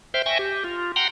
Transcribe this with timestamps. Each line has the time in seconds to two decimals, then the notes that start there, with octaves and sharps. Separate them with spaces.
0.14 C5 E5 G5 F6 G6
0.26 E5 G5 G#5 C#6 A#6
0.39 G4
0.64 F4
0.96 F#5 G5 A#5 C6